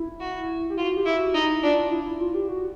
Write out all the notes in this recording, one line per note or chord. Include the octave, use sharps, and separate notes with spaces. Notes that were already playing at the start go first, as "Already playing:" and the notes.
Already playing: E4
F#4
G4
F4 F#4
G4
E4
F#4
D#4 E4
D4 F4
E4
E4
F4
G4
F#4